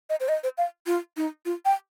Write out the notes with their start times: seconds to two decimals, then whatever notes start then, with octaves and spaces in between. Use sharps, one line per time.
0.10 D#5
0.20 C5
0.28 D#5
0.43 C5
0.58 F5
0.86 F4
1.17 D#4
1.45 F4
1.65 G5